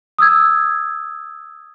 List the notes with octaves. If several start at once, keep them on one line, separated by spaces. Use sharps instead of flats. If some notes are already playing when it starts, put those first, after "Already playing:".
D#6 E6 G#6